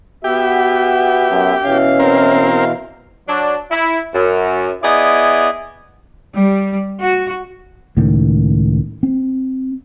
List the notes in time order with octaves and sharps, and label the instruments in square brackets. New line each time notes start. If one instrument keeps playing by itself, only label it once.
[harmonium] B3 E5 [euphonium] F#4 [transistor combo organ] G4
[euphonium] F#2
[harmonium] B2 E3 F5 [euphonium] C#4
[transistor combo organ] C4 A#4
[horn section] F#3 D4
E4
F#2
B3 E4 G#4 D5 D#5
[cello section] G3
F#4
[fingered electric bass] C#2 A2 D#3
C4